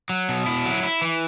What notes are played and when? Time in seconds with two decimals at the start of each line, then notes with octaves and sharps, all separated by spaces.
0.09 F#3
0.29 B2
0.46 E4
0.65 F#3
0.83 E4
1.02 E3